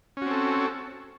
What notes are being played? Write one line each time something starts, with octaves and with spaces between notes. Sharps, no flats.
C4 C#4 F#4 A4